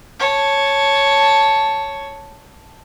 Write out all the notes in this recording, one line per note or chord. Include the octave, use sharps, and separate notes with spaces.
C#5 A5